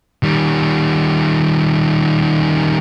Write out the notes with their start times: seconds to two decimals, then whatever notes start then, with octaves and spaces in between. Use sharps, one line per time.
0.23 D#3 G3